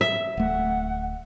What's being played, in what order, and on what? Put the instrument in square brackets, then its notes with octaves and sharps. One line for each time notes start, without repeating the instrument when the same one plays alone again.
[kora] E5
[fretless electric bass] D1 A3 [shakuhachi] F#5